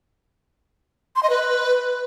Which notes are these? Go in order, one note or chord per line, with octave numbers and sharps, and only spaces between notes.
C6
D#5
B4